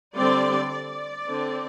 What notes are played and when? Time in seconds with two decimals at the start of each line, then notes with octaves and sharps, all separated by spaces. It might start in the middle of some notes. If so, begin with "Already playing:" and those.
0.15 D3 G3 C4 D5
0.71 D5
1.26 D3 C4